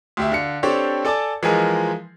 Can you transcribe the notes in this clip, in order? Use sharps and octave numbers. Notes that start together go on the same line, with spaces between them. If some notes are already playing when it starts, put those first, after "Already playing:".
D2 G4 E5
D3 F5 C#7
C4 D4 G4 A4 C5 C#5
A4 D5 G#5 A5 D6
E3 F3 G#3 F4 G#4 A#4